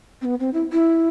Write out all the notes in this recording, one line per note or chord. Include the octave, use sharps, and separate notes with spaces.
C4
B3
C4
E4
E4